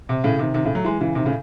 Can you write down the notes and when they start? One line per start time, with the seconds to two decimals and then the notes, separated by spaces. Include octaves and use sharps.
0.09 C3
0.24 A2 C#3
0.39 C3 D#3
0.54 C3 D#3
0.65 A2 C#3
0.75 F#3 A3
0.84 E3 G#3
1.01 C#3 E3
1.15 C3 D#3
1.25 A2 C#3